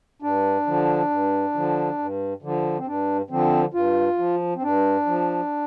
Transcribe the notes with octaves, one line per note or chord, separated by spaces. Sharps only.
G2 D4
D3 F3
G2
D3 F3
G2
D3 F3
C4
G2 D4
D3 F3 C4
G2 F4
F3
C4
G2 D4
F3